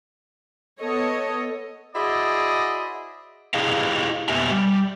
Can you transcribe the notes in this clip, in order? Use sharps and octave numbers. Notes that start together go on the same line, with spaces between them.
B3 A4 C#5 D#5
E4 F#4 G#4 C5 D5 D#5
E4 G4 G#4 D#5 F5
F2 B2 B3 G4 E5 G#5
G3